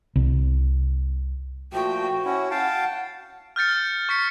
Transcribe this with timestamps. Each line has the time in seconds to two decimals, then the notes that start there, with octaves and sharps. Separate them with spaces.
0.16 C2
1.73 A#2 F3 A3 F#4 G5
2.25 C#4 E4 F#5
2.51 F5 G5 A5
3.56 F6 G6 A6 C#7
3.69 G7
4.09 C#6 B6 C#7